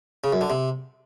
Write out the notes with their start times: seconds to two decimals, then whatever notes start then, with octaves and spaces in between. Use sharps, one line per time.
0.24 C#3
0.32 F#2
0.41 D3
0.50 C3